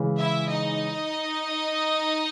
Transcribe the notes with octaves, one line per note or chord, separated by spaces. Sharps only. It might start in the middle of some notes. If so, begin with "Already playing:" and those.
Already playing: C#3 E3 G#3
E4 E5
D#4 D#5